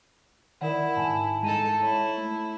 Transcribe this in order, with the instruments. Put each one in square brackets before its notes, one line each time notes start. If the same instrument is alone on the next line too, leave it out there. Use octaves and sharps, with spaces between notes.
[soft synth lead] D#3 [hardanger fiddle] E4 [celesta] A#4 D5 F#5
[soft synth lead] G#2 [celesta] G#5 A5
[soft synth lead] G#3 [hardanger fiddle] D#4 A4 [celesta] A5 D#7
[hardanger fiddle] E4 [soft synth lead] C#5
[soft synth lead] A3